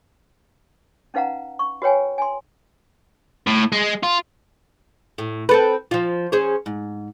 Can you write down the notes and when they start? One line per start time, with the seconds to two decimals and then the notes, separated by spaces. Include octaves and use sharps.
1.14 C#4 D#4 B4 F5 F#5 A#5
1.59 C#6
1.82 F#4 B4 C#5 G5 G#5
2.18 G#5 C6
3.47 A2
3.72 G#3
4.03 F4
5.18 A2
5.49 C4 A4 B4
5.91 F3 F4
6.32 C#4 G#4 C5
6.66 G#2